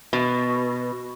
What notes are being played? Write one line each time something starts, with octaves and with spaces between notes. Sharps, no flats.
B2